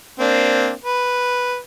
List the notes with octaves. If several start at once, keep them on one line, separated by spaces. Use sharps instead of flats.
A#3 C4 D4
B4